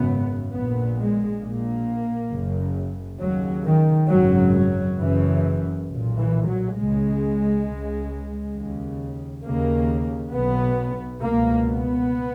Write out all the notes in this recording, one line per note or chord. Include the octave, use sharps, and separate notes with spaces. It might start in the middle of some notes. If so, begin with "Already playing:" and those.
Already playing: G#1 F#2 C#3 B3
A#1 A#2 B3
G#3
A#1 A#2 A#3
F#1 F#2 C#3
D#2 C#3 F#3
D#3
G#1 F#2 C#3 F#3
F#3
F#1 F#2 C#3 E3
B1 A#2
E3
F#3
C#2 C#3 G#3
C#2 C#3
D#2 C#3
D#2 C#3 A#3
B1 B2 B3
C#2 B2 A#3
B3